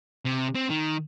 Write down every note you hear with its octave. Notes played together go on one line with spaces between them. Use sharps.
C3
C4
D#3